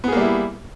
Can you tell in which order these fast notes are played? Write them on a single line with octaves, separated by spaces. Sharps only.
B3 G#4 A#3 G3 E4